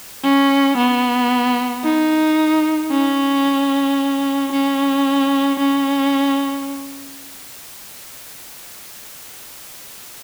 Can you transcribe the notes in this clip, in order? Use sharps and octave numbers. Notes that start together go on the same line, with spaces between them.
C#4
B3
D#4
C#4
C#4
C#4